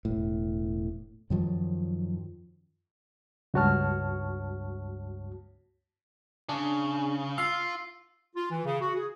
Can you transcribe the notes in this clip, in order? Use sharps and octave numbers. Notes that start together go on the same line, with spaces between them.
E1 A2
F#2 D#3 F3 F#3
C#2 G2 F#4 C#5 A5 F6
C#3 D4
F4 F5 E6 C7
F4
E3
C#3
F#4
G#4